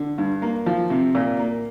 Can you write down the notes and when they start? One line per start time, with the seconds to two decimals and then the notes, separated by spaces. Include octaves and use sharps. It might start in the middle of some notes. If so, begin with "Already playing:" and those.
Already playing: D3
0.18 G2
0.42 A#3
0.66 F3
0.90 C3
1.15 A#2
1.39 A#3